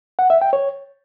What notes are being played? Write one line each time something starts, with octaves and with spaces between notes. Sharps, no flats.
F#5
E5
G5
C#5